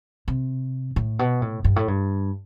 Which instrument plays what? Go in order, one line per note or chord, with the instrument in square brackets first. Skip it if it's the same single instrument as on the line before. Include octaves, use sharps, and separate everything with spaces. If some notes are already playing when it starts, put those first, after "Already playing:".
[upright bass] C3
A2
B2
A2
G2
A2
G2